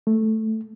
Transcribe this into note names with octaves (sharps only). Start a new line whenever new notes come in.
A3